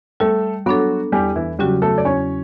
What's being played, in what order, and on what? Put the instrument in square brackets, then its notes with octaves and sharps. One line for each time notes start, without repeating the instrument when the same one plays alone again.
[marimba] G3 [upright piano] A3 A4
[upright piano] F#3 F#4 [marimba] B3 D4 A4
[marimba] E2 [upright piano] G3 G4
[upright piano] E3 E4
[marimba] C#3 F#3 C#4 F#4 [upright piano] G3 G4
[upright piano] A3 A4
D5
[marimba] E2 [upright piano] C#4 C#5